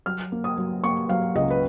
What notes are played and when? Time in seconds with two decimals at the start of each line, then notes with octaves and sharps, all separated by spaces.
0.06 F#3 F6
0.32 A#3
0.44 D#6
0.57 F#3
0.84 A#3 C#6
1.09 F#3 F5
1.35 C#2 D#5
1.50 B4